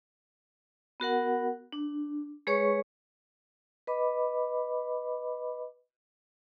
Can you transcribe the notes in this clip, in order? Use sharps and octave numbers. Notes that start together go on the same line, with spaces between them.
B3 F#4 A#4 F#5
D4
G#3 G#4 B4 C#5 C#6
B4 D#5 B5 D6